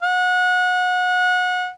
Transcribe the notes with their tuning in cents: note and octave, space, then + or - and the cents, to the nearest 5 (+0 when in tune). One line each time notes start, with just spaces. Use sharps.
F#5 -30